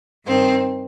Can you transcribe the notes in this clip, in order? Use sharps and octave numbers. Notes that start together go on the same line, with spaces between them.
G2 D#3 C4